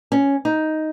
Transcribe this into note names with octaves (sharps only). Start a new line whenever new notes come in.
C#4
D#4